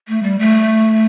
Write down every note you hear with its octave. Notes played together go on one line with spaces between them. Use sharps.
A3
G3
A3